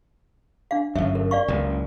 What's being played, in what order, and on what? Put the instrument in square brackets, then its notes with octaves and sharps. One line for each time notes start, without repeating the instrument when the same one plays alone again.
[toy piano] D4 F5
[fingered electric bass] G1 F#2 [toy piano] E5
[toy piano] A#4
D5 F5 C#6
[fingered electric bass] F#1 C#2